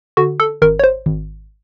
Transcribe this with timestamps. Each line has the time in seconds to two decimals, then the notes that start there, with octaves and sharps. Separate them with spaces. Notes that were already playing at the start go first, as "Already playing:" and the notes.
0.17 D3 F#4
0.40 A4
0.62 G#1 A#4
0.79 C#5
0.84 C5
1.06 G#1